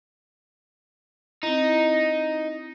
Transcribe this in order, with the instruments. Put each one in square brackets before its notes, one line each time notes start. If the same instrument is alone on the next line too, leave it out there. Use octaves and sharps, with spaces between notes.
[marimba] C4 E4 [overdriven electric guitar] D#4